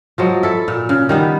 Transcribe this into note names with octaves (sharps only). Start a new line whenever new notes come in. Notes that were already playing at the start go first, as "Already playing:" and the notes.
F3 F#3 G#3
E4 A4
A#2
C#3
D#3 G3 B3